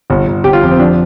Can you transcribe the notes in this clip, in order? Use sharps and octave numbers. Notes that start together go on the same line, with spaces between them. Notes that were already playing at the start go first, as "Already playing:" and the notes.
G1
G1
G1 G4
F4
F2
C4
F3 D4